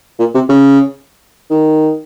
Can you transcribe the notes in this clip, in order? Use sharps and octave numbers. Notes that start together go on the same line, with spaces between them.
A#2
C3
C#3
D#3